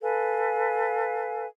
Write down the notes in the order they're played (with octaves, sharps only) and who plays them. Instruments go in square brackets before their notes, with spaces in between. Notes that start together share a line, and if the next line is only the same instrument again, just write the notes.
[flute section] A4 B4 F5 G#5